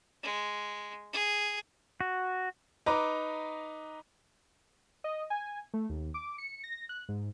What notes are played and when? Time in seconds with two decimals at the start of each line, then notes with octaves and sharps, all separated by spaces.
0.23 G#3
1.13 G#4
2.01 F#4
2.86 D#4 B4 A#5 D6
5.04 D#5
5.30 G#5
5.74 A3
5.90 D#2
6.14 D6
6.38 C#7
6.64 A#6
6.89 F#6
7.09 G#2